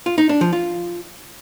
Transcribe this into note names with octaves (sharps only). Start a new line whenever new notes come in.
F4
D#4
D4
F3
F4